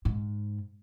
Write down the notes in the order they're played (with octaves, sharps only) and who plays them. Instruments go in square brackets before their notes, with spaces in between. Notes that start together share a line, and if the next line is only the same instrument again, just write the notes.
[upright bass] G#2